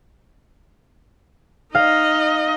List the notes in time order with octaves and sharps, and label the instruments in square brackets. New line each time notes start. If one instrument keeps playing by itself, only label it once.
[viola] D#4 D#5 [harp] F5